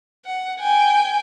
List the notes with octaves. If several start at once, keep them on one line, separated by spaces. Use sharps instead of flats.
F#5
G5 G#5